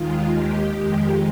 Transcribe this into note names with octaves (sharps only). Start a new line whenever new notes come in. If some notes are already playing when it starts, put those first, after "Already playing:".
Already playing: D#2 D#3 G#3 F4
G4
F2 D#3 G#3 G4